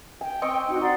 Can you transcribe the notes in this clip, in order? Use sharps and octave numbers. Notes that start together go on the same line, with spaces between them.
G5 G#5
C4 D#5 C#6
D#4 F#4
D#4 D5 F#5 C6